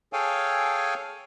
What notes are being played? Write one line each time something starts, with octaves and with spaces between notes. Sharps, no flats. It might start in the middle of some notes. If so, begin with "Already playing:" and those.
G#4 A4 C#5 F5 G5 G#5